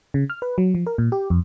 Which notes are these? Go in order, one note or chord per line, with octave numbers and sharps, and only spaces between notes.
C#3
F6
B4
F#3
F3
A#4
A#2
G4
F2